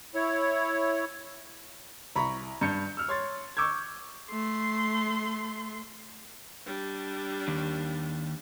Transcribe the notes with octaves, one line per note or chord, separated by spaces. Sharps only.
E4 C#5
C2 A#5 B5 C#6
G2 G6 C#7
E6 F6
C#5 C6 A6
C#6 D6 E6 G6 G#6
A3 C6
G3 D4
D#2